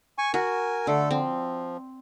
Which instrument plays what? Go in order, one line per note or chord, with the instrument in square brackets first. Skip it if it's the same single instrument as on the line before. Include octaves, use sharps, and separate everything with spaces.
[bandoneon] G#5 C#6
[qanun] F#4 [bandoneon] A#4 G#5
[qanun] D3 [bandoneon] A3 A4
[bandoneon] F3 [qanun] C4